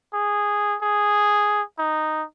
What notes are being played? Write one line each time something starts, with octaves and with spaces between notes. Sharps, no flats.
G#4
G#4
D#4